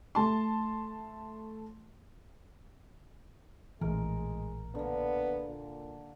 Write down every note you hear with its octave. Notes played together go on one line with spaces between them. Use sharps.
A3 A5 C6
A#1 A2 E3 G#3 A#4
D3 A#3 B3
A#2